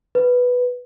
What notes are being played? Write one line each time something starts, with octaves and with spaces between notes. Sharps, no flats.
B4